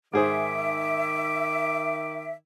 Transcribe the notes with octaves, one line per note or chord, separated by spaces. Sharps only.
G#2 D#3 G#4 C5 E5 D6